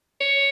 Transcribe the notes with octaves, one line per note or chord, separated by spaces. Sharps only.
C#5